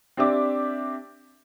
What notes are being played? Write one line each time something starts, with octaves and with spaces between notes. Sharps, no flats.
C4 D4 G4 E5 D6